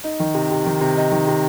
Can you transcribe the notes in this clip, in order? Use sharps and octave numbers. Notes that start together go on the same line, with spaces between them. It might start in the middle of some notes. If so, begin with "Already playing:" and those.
D#4
D#3
C3
C3
D#3
C3
D#4
D#3
C3